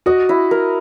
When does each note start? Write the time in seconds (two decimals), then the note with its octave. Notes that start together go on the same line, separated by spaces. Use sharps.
0.06 F#4 D#5
0.29 E4
0.51 A#4